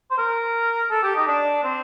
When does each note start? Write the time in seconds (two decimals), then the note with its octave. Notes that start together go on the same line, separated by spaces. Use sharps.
0.11 C5
0.18 A#4
0.90 A4
1.03 G4
1.15 D#4
1.27 D4
1.63 C4